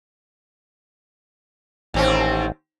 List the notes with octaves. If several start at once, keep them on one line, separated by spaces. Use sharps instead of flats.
A1 D#2 C4 C#4